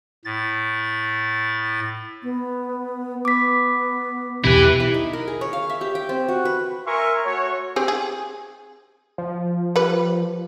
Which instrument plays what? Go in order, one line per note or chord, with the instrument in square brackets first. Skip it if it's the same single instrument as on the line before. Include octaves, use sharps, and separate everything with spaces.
[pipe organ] A2 A6
[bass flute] B3
[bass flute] B3 [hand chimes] D6 B6
[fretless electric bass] B1 E2 B2 [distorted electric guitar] E4 B4 [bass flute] G4
[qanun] E4
D#4
A#4
G#4
C#5
F5
E5
G4
G5
C4
F#4
B4
[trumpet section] A#4 E5 G#5 C6 C#6
A3 F#4 C#5
[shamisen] C4 G4 G#4
G#4
[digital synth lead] F3
[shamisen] G3 B4